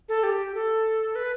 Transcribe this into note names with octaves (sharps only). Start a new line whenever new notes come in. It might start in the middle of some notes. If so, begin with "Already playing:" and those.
A4
G4
A4
B4